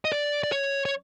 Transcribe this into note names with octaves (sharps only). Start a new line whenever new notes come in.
D#5
D5
D5
C#5
C#5